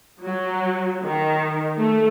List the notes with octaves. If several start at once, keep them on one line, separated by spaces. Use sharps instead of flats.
F#3
D#3
A3